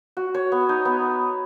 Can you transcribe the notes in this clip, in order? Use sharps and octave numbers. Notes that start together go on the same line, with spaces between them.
F#4
C#5
B3
D#4
B3